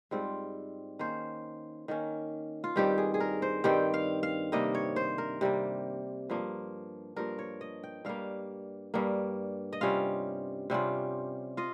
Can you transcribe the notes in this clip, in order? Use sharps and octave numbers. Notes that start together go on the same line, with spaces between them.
G#2 G3 C4 F4
D#3 A#3 C#4 C5
D#3 A#3 C#4
F4
G2 D#3 G3 C4 G4
G#4
G#4
A#4
C5
G2 D#3 G3 C4 G5
F5
F5
C3 G3 A#3 D#5
C#5
C5
A#4
C3 G3 A#3
G2 F3 A#3
G2 F3 A#3 A#4
C#5
D#5
G5
G2 G3 A#3 F5
G2 G3 A#3
D#5
C3 G3 C#4 F4 F5
C3 G3 C#4 F4
F4 D#5